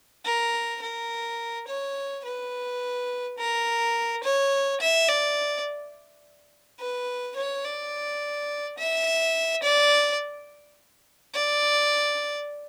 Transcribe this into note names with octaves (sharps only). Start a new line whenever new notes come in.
A#4
A#4
C#5
B4
A#4
C#5
E5
D5
B4
C#5
D5
E5
D5
D5